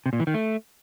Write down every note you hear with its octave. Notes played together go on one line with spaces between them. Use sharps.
C3
A#2
E3
D#3
A3